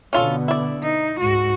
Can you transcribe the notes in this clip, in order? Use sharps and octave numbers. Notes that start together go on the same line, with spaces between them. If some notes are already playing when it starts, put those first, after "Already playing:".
B2 D3 B3 C#4 F4 A4
E4 D5
D#4
C#2 G#2 F#4